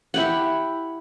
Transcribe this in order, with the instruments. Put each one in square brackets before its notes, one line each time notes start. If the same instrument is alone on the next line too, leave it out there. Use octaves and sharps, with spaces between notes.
[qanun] E4 G4 F#5